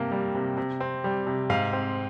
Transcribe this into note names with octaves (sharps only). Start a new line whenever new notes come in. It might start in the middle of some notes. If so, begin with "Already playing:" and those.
Already playing: G2 C3 A#3
G3
C3
C3
C4
G3
C3
G#2 F5
C4